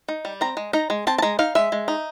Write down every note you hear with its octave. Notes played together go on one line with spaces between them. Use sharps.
D#4
G3
C4 A#5
G#3
D#4 A#5
G#3
C4 A5
A5
G#3 A#5
D#4 F5
G#3 E5
G#3
D#4